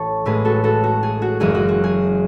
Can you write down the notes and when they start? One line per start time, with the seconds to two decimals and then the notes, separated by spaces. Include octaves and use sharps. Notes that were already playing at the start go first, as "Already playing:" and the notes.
Already playing: A1 A2 E3 A4 C#5
0.26 A1 A2 G#3 G#4 B4
0.45 F#4 A4
0.64 F#4 A4
0.84 F#4
1.03 G#4
1.22 F#4
1.40 F#1 F#2 E3 G#3 G#4
1.55 F#4
1.69 F#4
1.84 G#4